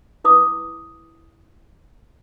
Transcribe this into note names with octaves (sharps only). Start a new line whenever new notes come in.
E4 B4 D6 D#6